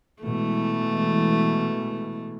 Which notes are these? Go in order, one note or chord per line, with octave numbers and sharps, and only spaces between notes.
B2 E3 G#3 A3